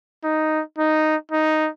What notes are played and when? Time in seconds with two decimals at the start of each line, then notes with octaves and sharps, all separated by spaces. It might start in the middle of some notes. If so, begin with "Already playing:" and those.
0.24 D#4
0.78 D#4
1.32 D#4